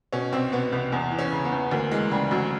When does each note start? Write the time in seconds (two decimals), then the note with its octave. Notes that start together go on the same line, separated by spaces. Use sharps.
0.13 B2 C#4
0.32 C2 C4
0.52 B2 B3
0.72 C2 B3
0.92 E2 B3
1.11 E3
1.19 C#4
1.32 C#3
1.45 B3
1.52 E2
1.71 D2 A#3
1.91 E3 G#3
2.11 C#3 G3
2.31 D2 F#3